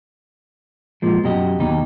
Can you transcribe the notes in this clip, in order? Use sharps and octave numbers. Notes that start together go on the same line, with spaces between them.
A#2 F3 G#3
F#2 B2 F#4 G4 D#5
D#2 B2 D#4 G4